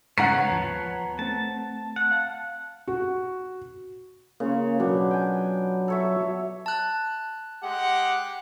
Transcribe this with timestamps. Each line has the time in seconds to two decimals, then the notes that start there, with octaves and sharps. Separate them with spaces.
0.18 G#2 C#3 B3 C#5 F#5 A#5 F#6 C7
0.50 D#2 F3 A5
1.19 A3 C4 A5
1.96 F#5
2.11 F5 A5
2.87 F#4
4.40 C#3 A#3 F4 C#5
4.80 B2 F#3 D4
5.11 G5 G#5
5.88 A4 C#5 E5
6.66 A5 F#6
7.63 G#3 G4 F#5